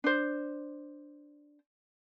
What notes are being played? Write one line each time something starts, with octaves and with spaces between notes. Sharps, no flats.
D4 C5